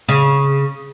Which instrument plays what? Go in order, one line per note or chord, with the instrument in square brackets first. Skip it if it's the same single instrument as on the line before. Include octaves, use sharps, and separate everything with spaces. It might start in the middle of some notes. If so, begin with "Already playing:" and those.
[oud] C#3